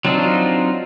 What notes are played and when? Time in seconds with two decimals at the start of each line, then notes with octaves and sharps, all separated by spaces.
0.05 F#3 C4 D4 D#4 F4